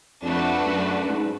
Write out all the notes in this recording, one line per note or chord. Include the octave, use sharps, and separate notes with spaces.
F2 A3 D4 F#4 B4
F#2
G#2